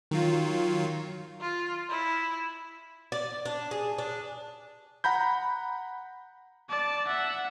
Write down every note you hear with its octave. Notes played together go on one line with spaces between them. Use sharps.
D#3 F#3 F4
F4
E4
D5
D4
G#4
D4
F#5 A#5 B5 G6
D5 A5
E5 F#5